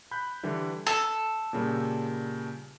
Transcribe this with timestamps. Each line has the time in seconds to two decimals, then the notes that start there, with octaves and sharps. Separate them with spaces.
0.11 B5 F#6 G6
0.43 D3 E3 G3
0.86 A4 E6
1.53 A#2 C#3 G3